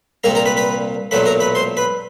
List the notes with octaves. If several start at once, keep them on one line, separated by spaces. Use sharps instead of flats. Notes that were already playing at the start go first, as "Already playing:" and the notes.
C2 A#2 G3 A#3 A#4 A#5
A#4 A#5
B4 B5
B4 B5
B1 A#2 F#3 A3 B4 B5
A#4 A#5
B4 B5
C5 C6
B4 B5